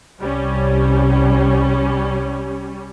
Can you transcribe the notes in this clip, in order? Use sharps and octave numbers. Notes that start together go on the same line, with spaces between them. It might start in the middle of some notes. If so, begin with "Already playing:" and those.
C2 G3 C#4